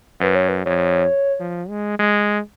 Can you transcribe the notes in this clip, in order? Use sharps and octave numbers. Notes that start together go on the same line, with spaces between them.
F#2 B4
C#5
B4
F2 C#5
F3
G#3
G#3